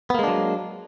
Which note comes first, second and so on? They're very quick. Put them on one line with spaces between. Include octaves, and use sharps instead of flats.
B3 A#3 G#3 D4 F#3